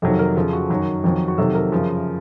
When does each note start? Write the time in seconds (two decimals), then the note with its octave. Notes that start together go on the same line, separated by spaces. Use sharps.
0.02 F2 C3 D#3 F#3 A4
0.19 A#4
0.36 F2 C#3 F3 A4
0.53 F#4
0.70 F#2 D#3 F#3
1.04 F2 D#3 F#3
1.28 F#4
1.38 F2 C3 D#3 F#3 A4
1.55 A#4
1.72 F#2 C#3 F3